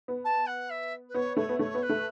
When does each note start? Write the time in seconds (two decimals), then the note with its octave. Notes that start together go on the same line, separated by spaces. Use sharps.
0.08 B3
0.24 A5
0.46 F#5
0.69 E5
1.08 B4
1.14 B3 C#5
1.37 A3 C#5
1.49 B3
1.59 A3 C#5
1.74 B3
1.82 B4
1.89 A3